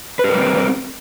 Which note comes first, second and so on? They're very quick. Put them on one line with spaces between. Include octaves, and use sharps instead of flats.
B4 G4 A#4 G3 C4